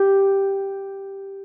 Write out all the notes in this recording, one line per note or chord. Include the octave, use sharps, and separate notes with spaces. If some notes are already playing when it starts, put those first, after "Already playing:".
Already playing: G4